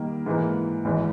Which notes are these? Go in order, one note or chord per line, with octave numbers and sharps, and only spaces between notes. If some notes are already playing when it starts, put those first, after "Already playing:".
Already playing: D#3 G3 A#3
G#2 E3 A#3
G#1 G#2 E3